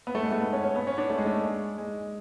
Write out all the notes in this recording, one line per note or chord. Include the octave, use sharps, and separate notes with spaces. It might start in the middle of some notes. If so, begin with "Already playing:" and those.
B3
A3
G#3
A3
B3
C#4
C#4
B3
C#4
D4
A3
G#3
A3
G#3
G#3